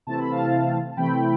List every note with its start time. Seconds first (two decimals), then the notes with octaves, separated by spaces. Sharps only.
0.07 C3 E3 A3 C4 E4 A5
0.19 B5
0.31 F5 A5
0.91 A5
0.97 C3 E3 A3 C4 E4 G5 B5